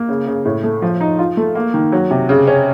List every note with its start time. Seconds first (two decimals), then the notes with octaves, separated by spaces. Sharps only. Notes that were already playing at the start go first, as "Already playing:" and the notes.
Already playing: A#3
0.09 C#3
0.27 C#3
0.45 A2
0.64 A3
0.82 F3
1.01 D#4
1.19 F4
1.37 A3
1.55 A#3
1.74 D#3
1.92 F#3
2.10 C3
2.29 C#3
2.47 C#4